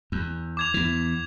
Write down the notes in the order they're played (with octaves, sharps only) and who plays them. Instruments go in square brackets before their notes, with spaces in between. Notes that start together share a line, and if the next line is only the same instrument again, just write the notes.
[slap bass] E2
[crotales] D6 G#6 F7
[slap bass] E2 E3